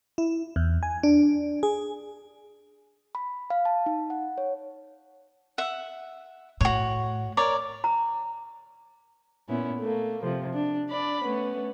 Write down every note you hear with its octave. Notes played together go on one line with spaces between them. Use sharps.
E4
E2
G#5
D4
G#4
B5
F5
A5
D#4
F#5
C#5
E5 F#5
A2 F#4 C#5
A#4 C#5 D5
A#5
A#2 B3 C#4 E4
A3 A#3
C3 F3
D4
D4 D5 B5
A3 B3 C#4